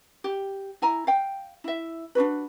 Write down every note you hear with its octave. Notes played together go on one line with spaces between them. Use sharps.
G4
E4 G#5 A#5
F5 G5
E4 E5
D4 D#4 F#4 B4